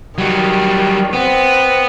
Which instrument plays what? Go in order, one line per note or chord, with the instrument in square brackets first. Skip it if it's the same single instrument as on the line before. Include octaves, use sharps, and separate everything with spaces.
[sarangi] D#3 [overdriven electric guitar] F#3 G3
[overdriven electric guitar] B3 [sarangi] C4